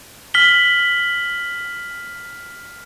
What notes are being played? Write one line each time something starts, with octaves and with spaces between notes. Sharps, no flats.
F6 B6 F#7 G7